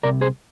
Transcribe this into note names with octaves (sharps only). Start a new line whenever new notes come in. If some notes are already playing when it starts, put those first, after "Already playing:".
C2 C3 A#4 D5
G#4 C5